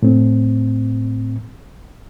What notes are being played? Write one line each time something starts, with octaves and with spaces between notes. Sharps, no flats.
A2 C4